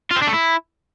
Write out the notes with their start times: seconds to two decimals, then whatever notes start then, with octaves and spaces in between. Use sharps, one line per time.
0.11 F4
0.16 C4
0.22 D4
0.27 A3
0.33 E4